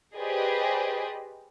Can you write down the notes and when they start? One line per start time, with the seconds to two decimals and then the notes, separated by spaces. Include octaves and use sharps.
0.18 G4 G#4 B4 C5 D5 D#5